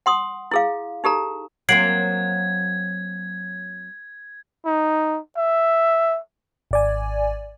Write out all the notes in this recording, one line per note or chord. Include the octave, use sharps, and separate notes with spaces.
F#5 C6 D#6
E4 G#4 F5
D#4 G4 A4 A#5
F#3 A#3 C4 G#6 C7 D7 F#7
D#4
E5
G#1 D5 G#5